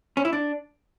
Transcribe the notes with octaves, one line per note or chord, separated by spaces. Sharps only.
C#4
E4
D4